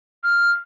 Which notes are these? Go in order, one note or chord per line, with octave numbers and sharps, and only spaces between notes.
F6